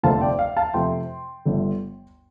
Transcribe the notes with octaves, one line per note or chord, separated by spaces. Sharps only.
F1 F2 D3 A3 C4 F5 A5
D5 G5
F5
F5 A5
F2 C3 A3 C4 G5 C6
G1 G2 D3 A3